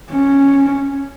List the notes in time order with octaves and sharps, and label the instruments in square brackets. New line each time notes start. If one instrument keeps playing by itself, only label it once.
[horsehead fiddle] C#4